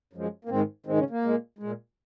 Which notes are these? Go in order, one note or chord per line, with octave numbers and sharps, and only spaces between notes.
F#2 F3 G#3
A#3
G#2 D#3 G#3 C4
G#2 D#3 G#3 C4
C#3 C#4
A#3
A#2 G#3
A#2 G#3